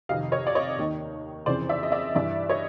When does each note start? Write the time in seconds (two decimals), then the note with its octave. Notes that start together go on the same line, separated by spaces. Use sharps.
0.09 F2 C3 D#3 D#5 F5
0.32 C#5 D#5
0.47 D5
0.55 C#5 D#5
0.78 D#2 D#3
1.46 F2 C#3 E3 C5 D5
1.69 D5 E5
1.83 D#5
1.92 D5 E5
2.15 G2 E3 D5 E5
2.50 C#5 D#5